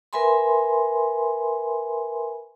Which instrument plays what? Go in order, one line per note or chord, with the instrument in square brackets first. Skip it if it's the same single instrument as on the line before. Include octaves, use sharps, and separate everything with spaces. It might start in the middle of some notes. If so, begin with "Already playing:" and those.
[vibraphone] A#4 B4 E5 G#5 B5 C6